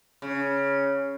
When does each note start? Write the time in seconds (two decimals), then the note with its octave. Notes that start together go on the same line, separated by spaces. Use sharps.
0.22 C#3